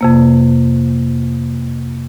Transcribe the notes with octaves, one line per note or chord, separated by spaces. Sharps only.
F2 C3 A#3